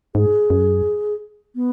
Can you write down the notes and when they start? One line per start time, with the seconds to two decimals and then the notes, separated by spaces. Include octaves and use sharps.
0.15 G#2 G#4
0.50 F#2
1.55 B3